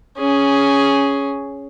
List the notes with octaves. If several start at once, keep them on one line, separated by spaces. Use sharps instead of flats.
C#4 G#4